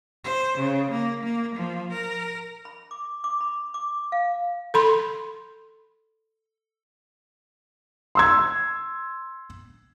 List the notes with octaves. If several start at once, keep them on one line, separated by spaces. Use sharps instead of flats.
C5
C#3
A#3
A#3
F3
A#4
B5
D6
D6
B5
D6
F5
A4 B5 C6
C6 E6 G#6